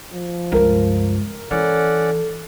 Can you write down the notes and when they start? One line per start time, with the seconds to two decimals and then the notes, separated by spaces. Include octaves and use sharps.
0.14 F3
0.52 C#2 G2 A#4
1.51 E3 C#4 A4 D5 F#5